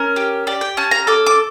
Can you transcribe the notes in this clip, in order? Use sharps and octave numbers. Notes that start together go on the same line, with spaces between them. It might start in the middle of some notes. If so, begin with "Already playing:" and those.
Already playing: C#4 A#4
G4
G4 D5
G5
C#4 A5
A#5
A4 D6
D6